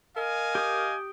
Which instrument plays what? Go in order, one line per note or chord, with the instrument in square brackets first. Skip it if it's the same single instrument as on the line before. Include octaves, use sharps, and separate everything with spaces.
[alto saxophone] A#4 [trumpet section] D#5 F5 G#5
[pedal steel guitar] G4 D#6